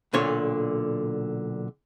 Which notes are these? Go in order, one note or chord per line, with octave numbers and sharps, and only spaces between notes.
B1 A#2 D3 C#5